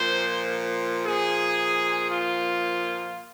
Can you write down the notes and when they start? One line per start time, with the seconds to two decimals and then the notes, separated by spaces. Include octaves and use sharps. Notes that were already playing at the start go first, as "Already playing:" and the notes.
Already playing: A#2 F3 C5
1.06 A#2 F3 G#4
2.11 F4